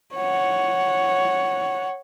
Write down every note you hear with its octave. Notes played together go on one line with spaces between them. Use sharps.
C#5 F#5